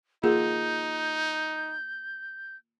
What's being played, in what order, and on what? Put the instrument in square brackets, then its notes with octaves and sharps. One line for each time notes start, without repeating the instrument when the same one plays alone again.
[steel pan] A#3 F4 F#5 [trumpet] D#4 [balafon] G#4 [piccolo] G6